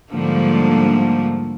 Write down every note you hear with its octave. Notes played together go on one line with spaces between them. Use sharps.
G#2 D3 F3 G3 A3 A#3